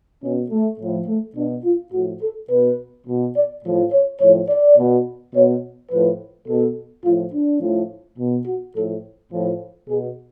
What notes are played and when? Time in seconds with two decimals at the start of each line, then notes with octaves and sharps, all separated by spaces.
0.23 B2 C#4
0.51 A3
0.79 A2 F3
1.07 A3
1.36 B2 D4
1.64 F4
1.93 A2 F3 F#4
2.22 A4
2.49 B2 B4
3.07 B2
3.36 D5
3.64 A2 F3
3.92 C#5
4.20 A2 F3 C#5
4.49 D5
4.77 B2
5.34 B2 C#5
5.91 A2 F3 B4
6.47 B2 A4
7.04 A2 F3 F4
7.32 D4
7.61 A2 F3
8.18 B2
8.47 F#4
8.75 A2 F3 A4
9.32 A2 F3
9.89 B2 G#4